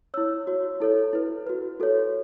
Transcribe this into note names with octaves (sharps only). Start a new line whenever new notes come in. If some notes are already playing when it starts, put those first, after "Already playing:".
E4 C#5 E6
F#4 C#5
E4 A4 C#5
E4 B4
F#4 B4
F#4 A4 C#5